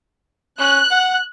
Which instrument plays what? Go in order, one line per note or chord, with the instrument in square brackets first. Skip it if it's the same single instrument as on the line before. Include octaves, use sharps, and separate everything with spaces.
[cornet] C#4 [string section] F#6
[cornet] F#5